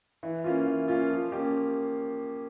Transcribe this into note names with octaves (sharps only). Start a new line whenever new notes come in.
E3
A#3 C#4 F4
E3
A#3 C#4 F4
F3
A#3 C#4 G4